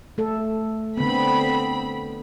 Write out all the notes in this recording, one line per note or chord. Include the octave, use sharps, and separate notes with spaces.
A3 A4
D3 B3 C4 B5